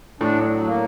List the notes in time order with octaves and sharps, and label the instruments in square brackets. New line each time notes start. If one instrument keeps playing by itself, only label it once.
[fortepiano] A2 [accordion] D4
[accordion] F#3
F#3
A#3